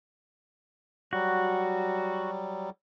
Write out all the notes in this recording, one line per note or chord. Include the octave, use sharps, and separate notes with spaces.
F#3 G3 F#4